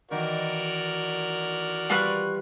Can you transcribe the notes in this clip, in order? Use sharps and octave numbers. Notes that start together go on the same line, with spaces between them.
D#3 E3 F#4 A#4 D5
G3 F4 B4 C#6 F#6